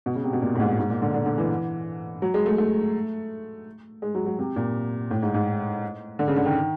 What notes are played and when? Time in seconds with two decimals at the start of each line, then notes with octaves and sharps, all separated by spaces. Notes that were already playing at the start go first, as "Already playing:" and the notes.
0.06 B2
0.15 C#3
0.24 C3
0.33 B2
0.42 A#2
0.55 A2
0.60 G#2
0.78 G#2
0.90 A#2
1.02 D3
1.14 D3
1.26 D3
1.38 E3
2.22 F#3
2.34 G#3
2.46 A3
2.58 A3
4.02 G#3
4.15 F#3
4.26 F#3
4.39 C3
4.56 A#2
5.11 A2
5.23 G#2
5.34 G#2
6.19 D3
6.28 C#3
6.36 D3
6.46 D#3